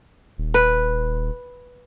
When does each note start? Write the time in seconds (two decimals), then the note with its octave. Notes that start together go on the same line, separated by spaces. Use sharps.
0.38 D#1
0.54 B4